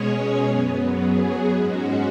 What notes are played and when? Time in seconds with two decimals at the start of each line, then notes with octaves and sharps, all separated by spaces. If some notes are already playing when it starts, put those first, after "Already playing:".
Already playing: B2 G#3 C#4 G#4 C#5
0.43 F#2 F#3 B3
0.95 G#4
1.49 G#2 G#3 C#4 F#4